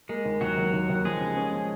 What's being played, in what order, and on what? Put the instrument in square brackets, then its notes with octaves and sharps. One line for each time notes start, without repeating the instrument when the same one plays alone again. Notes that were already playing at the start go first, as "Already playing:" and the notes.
[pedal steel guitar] G#3 [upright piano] A#3
[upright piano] D#2
[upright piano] D#2 [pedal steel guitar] F#3 F#4
[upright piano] D#2
D#2
D#2
[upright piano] F3 [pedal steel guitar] G#3 G#4
[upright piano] C#3
C#4
F3